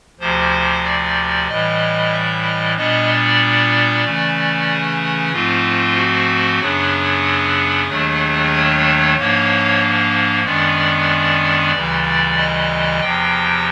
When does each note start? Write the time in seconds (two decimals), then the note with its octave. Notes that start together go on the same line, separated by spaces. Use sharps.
0.20 D2 C3 F3 C5
0.84 D5
1.48 A2 E3 G3 D#5
2.12 E5
2.44 D#5
2.76 A#2 G3 B3 D4 D#5
3.08 D5
4.04 C#3 E3 A3 C#4
4.68 G#4
5.32 G#2 F3 A3 C4 F4
5.96 F#4
6.60 F#2 C#3 F#3 B3 D4 G#4
7.88 D#2 D#3 F#3 A3 D4
8.52 C#5
9.16 G#2 F3 A#3 D4 C#5
10.44 F#2 D#3 G#3 B3 D4 D5
11.72 D2 C#3 E3 G3
12.36 D#5
13.00 E2 C3 F3 G5